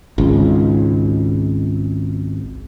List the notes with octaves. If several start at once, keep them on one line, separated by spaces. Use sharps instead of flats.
G#1 C#2